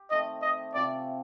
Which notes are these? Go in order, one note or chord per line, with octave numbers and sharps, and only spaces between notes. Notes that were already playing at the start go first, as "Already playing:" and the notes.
Already playing: G4
D#3 A3 C4 D#5
D#5
C3 F3 C4 F4 D5